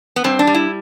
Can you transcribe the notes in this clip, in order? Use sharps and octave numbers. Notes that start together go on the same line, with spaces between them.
B3
G2 C4
D4
G3
E4